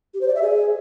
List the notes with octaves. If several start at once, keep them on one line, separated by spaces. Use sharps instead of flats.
G4
C5
D5
E5
G#4